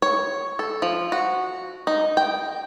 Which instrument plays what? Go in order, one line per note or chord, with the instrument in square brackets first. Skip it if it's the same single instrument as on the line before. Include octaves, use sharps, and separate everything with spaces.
[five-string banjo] C#5
A4
F3
F#4
D#4
G5